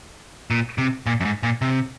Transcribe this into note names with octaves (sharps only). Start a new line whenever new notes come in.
A#2
C3
A#2
F#2
G#2
A#2
C3